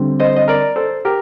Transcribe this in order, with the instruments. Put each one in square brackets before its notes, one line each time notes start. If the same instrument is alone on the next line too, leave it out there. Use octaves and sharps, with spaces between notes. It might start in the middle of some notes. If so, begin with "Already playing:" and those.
Already playing: [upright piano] D3 G3 C4
[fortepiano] C5 D#5
D#5
A#4 D5
A4 C5
G4 A#4